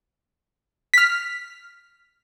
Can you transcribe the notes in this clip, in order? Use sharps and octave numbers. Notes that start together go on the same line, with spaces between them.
F6 B6